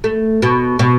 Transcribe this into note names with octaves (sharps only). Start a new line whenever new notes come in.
A3
B2
B2